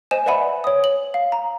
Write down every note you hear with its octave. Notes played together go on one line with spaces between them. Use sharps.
C5 D#5 G#5 E7
B4 D5 E5 F#5 G#5 B5
C#5 D#6
F#7
F5
A#5